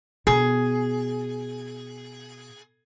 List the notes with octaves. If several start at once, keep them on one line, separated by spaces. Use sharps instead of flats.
B2 G#4